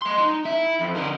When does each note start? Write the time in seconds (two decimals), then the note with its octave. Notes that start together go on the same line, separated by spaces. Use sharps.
0.02 D#5 C6
0.19 D#4
0.45 E4 E5
0.81 F2
0.96 D3 A#4